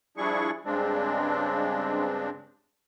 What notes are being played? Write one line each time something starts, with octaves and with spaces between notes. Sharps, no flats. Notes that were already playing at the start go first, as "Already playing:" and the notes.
F3 G3 D4 E4 G#4 C#6
G2 C#3 G#3 C4 D4